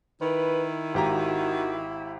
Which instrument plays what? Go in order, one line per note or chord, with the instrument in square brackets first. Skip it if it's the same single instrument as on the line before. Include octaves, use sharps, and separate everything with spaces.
[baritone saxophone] D#3 [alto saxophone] E4 [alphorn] B4
[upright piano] G#1 G4 A#5 [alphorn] F#4